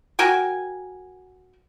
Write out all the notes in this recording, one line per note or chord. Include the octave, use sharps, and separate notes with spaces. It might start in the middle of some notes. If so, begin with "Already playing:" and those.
F#4 A#4 G5 G#5